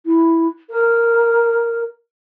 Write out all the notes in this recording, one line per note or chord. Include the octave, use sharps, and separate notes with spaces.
E4
A#4